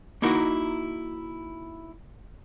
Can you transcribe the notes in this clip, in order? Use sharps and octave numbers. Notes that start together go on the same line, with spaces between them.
A#3 D#4 E4 F#4 A#4